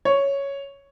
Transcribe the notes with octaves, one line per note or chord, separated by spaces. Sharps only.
C#5